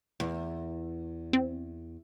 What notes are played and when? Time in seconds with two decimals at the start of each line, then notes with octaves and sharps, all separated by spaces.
0.20 E2
1.33 C4